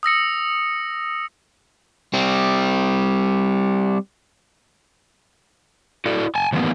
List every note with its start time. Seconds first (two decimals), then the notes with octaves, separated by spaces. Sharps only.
0.03 D#6 E6 A#6 C#7
2.14 G3 C4
6.06 E4 F#4 A4 D5
6.35 G#5 A5
6.53 A2 D#3 E3 G3 A#3 B3